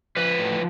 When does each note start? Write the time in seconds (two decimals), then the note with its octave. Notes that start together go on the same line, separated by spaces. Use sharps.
0.16 F3 B4
0.39 A2